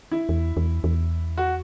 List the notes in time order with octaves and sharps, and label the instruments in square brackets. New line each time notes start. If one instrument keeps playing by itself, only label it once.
[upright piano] E4
[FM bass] E2
E2
E2
[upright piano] F#4